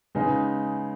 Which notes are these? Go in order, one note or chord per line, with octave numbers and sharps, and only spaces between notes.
C#3 G#3 B3 D#4